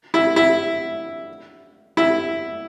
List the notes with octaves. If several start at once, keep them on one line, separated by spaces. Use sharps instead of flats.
E4
E4
E4